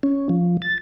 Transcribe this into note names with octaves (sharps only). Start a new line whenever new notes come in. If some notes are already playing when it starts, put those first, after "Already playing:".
C#4
F3
A6